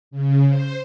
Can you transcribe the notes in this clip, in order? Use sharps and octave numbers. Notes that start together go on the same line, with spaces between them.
C#3
C5